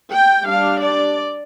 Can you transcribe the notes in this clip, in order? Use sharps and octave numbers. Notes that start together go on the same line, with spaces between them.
G5
G3 D4 F5
D5